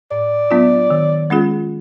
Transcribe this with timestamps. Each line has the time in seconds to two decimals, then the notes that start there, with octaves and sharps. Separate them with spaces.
0.11 A2 D5
0.51 F#3 B3 D4 F4
0.90 D#3
1.30 G#3 C#4 F4 G#4